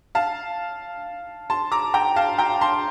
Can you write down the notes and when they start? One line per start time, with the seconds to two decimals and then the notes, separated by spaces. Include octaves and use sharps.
0.15 F5 A5
1.50 A5 C6
1.72 A#5 D6
1.94 G5 A#5
2.16 F5 A5
2.39 G5 A#5
2.61 A5 C6